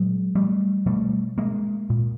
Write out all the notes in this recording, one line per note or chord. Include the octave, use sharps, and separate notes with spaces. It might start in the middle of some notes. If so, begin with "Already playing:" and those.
Already playing: A#2 F#3 G#3
G3 A3
B2 G3 A3
G#3 A#3
A#2